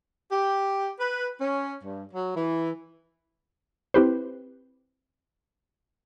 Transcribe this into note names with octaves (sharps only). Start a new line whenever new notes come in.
G4
B4
C#4
G2
F#3
E3
C4 E4 G4 B4 C5